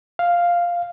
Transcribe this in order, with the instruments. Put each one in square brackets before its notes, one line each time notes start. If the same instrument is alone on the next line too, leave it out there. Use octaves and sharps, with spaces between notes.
[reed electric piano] F5